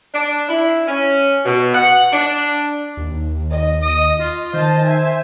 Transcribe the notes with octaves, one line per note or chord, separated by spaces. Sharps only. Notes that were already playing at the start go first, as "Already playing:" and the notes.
D4
E4
C#4
B2
F#5
D4
D#2
D#5
D#6
F4
D#3 C5 D#5 A5
E5 G#5